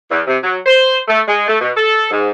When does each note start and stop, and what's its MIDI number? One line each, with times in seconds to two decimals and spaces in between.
0.10 0.20 40
0.27 0.37 48
0.43 0.57 54
0.66 0.97 72
1.07 1.20 57
1.27 1.44 56
1.47 1.56 57
1.60 1.70 47
1.76 2.07 69
2.11 2.30 44